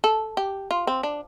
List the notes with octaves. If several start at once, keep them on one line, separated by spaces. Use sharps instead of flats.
A4
G4
F4
C4
D4